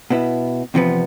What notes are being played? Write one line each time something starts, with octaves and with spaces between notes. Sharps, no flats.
B2 B3 E4
E2 C3 F3 B3